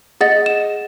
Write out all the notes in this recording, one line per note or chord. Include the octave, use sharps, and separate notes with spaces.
G#4 D#5 F#5 A6
E7